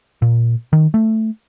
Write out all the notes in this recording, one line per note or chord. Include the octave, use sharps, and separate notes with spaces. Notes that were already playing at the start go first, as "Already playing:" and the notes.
A#2
D#3
A3